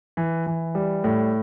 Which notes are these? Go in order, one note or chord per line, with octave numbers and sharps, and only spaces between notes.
E3
E3
G3
A2